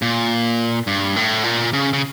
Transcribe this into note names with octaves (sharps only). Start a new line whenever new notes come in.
A#2
G2
A2
A#2
C#3
C#3